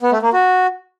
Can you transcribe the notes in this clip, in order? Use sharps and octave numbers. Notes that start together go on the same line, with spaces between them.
B3
A3
A#3
F#4